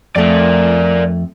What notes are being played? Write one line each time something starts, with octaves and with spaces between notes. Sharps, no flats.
F2 A3 A#4 D5